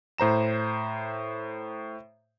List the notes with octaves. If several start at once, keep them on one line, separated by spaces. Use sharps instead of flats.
A2 C5 A#5 E7